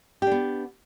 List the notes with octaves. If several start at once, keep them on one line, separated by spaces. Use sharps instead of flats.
B3 D4 G4